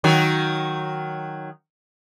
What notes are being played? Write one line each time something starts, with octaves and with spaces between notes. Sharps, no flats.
D#3 F#3 F#4